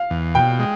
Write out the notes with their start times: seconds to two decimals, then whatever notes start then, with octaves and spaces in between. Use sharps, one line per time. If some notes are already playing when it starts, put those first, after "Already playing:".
Already playing: F5
0.10 E2
0.35 B2 G5
0.59 G#3